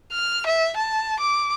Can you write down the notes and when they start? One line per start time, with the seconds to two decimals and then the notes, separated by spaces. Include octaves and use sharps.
0.12 F6
0.46 E5
0.77 A5
1.20 D6